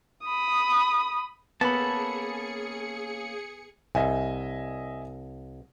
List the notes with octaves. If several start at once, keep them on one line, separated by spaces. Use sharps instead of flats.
B5 D#6
A#3 B3 C#4 G#4 A4 A5 B5 C#7
C2 D#5 E5 G#5